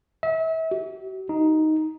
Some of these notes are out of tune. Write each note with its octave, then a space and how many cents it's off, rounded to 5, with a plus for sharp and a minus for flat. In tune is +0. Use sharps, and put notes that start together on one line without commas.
E5 -35
F#4 +45
D#4 +5